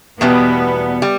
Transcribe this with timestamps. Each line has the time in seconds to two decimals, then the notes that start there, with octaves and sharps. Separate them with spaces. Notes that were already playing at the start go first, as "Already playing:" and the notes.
0.21 E2 B2 G3 B3
1.02 G3